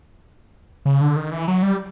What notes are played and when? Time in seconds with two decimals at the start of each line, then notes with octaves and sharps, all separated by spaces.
0.85 C#3
1.01 D3
1.16 D#3
1.32 E3
1.48 F#3
1.62 G3